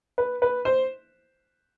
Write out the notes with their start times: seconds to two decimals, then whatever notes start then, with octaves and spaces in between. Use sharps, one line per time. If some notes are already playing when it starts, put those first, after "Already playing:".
0.18 B4
0.42 B4
0.65 C5